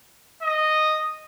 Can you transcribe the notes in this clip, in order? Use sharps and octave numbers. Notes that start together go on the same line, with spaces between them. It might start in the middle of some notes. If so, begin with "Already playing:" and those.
D#5